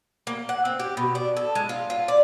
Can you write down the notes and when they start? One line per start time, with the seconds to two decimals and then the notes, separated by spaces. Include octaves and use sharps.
0.27 A#3
0.49 F#5
0.65 C4
0.79 G4
0.97 B2
1.15 D4
1.36 A4
1.55 G#3
1.69 F4
1.90 F4
2.08 D5